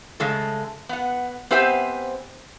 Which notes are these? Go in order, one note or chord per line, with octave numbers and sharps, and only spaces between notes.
C#3 G#3 A3 A4
B3 F#5
B3 C4 G4 C5 E5 G#5